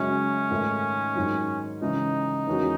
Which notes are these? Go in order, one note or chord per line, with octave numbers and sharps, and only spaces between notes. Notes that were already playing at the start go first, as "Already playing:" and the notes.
Already playing: F#2 C#3 G#3 C#4 D#4 F#4
G#2 D#3 A3
G#2 D#3 F#3
C#3 E3 G#3 D#4
E2 D#3 G#3 C#4 F#4